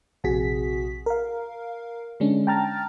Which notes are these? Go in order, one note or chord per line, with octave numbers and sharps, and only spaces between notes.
A#1 C3 F#4 G#4 B6
A#4 F5
D3 G#3 C#4 D4
G5 A5 A#5 F6 A6